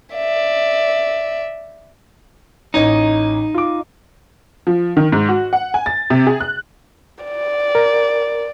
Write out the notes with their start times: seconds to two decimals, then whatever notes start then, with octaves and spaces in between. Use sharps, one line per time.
0.14 D5 E5
2.74 A1 D#4 C#5 D#5
3.54 F4 D6
4.67 F3
4.97 D#3
5.12 G#2
5.29 F#4
5.53 F#5
5.74 G#5
5.86 A6
6.10 C3
6.27 G#4
6.40 F#6
7.24 D5
7.75 A#4